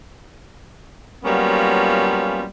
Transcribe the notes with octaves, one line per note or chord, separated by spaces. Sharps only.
F#3 G3 A#3 B3 C#4 F4